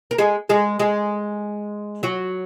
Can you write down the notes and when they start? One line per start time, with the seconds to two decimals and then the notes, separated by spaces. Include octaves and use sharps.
0.11 A#4
0.18 G#3 G#4
0.49 G#3 G#4
0.79 G#3 G#4
2.03 F#3 F#4